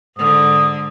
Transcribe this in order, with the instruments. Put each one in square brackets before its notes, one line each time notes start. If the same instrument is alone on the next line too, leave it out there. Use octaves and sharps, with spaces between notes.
[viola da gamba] G#2 D3 [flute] D#6